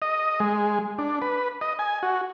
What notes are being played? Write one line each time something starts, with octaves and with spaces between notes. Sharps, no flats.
D#5
G#3
D4
B4
D#5
G#5
F#4